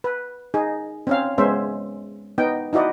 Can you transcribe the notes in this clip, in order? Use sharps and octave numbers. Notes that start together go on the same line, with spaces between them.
B4
D#4 G#4
C4 C#4 F5
G#3 B3 C#4 C5 E5
B3 D#4 G5
D#4 E4 F#4 D5 D#5